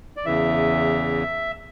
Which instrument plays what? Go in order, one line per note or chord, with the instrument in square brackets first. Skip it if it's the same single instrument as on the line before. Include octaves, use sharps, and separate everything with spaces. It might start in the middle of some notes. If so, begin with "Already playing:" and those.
[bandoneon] D5
E2 C#3 E3 E5